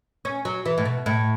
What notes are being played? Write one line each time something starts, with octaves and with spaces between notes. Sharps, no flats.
C#4
F#3
E3
A2
B2
A2